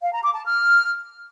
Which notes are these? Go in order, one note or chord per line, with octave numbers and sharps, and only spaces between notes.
F5
A#5
D6
A5
F6